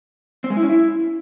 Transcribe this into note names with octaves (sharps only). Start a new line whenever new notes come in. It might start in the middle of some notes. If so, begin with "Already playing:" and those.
C4
G#3
E4
C#4
E4